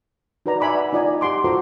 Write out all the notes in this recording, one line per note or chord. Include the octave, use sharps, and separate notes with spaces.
D#4 F#4 B4 D5 A#5
D5 E5 G#5 B5 C#6 D6
F#5
D#4 F4 D5 D#5 G#5 A#5
G4 F#5 C6 D6
F4 F#4 A4 C5 A#5 D6